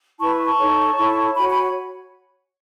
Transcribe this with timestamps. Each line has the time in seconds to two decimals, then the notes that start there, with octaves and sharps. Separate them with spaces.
0.19 E4 B4 A5 C#6
0.46 A5 C#6
0.58 D#4 A4 C#5
0.98 E4 A4 C#5
1.36 F#4 C#5 G#5 B5
1.50 G#5 B5